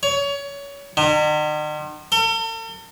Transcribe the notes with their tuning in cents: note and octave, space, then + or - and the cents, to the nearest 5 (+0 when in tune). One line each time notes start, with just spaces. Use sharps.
C#5 +25
D#3 -45
A4 +45